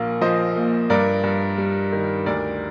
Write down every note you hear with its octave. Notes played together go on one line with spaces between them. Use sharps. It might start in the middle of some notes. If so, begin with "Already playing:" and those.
Already playing: A#1 A#3
F3 C5 D#5
A#2
G2 A#4 D5
G2
G3
D#3
D2 A#4 D5